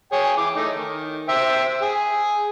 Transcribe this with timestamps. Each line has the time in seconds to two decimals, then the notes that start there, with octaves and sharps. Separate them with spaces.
0.12 G#4 C#5 G5
0.37 E3 D6
0.56 A3 D#4
0.76 D#3
1.29 C5 E5 G5
1.82 G#4